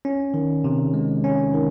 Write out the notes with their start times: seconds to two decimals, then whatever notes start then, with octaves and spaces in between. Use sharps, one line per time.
0.05 C#4
0.34 D#3
0.64 C3
0.94 G#3
1.24 C#4
1.54 D#3